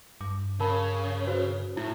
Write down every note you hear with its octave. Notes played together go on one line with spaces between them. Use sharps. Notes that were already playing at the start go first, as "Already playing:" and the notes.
G2 D6
C#3 A#4 A5 B5
F#4 B4 C5
A2 E4